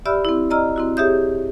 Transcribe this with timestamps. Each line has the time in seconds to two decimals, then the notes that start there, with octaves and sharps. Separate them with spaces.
0.06 G4 D5 E5 B5 E6 F6
0.25 C4 E4
0.50 D5 D#5 A#5 E6 F6
0.76 C4 E4 F#4
0.97 G4 G#4 C#5 E5 D#6 G6